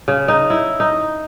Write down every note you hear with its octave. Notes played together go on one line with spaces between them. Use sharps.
C#3
D#4
E4
D#4